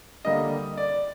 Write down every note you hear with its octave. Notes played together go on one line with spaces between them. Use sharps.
D3 G3 A#3 D#5
D5